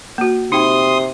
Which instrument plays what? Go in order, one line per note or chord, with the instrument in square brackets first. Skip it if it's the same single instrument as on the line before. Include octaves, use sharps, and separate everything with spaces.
[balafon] A#3 F#4
[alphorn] C3 [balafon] D#4 G5 [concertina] C6 D#6